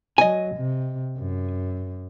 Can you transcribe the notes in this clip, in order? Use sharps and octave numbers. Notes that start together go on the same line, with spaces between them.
F#3 D#5 G#5
C3
F#2